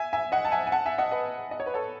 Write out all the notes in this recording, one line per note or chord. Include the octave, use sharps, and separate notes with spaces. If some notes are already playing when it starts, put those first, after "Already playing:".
Already playing: E5 G#5
E5 G#5
D#5 F#5
A5
E5 G#5
G#5
F#5 A5
E5 G#5
D#5 F#5
B4 D#5
D#5
C#5
B4
A4 C#5